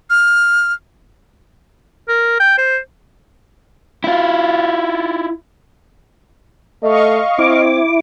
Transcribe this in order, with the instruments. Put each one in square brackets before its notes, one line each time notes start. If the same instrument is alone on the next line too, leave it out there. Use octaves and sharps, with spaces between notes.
[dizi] F6
[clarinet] A#4
G5
C5
[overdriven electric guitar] E4 F4
[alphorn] A3 [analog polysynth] D#5 F5 C#6
[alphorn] C4 [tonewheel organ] E4 D6